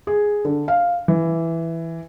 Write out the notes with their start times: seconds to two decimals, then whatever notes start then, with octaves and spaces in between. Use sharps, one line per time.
0.07 G#4
0.45 D3
0.68 F5
1.08 E3